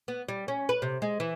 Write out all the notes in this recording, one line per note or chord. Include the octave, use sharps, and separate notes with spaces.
B3
G3
C#4
B4
C3
G#3
E3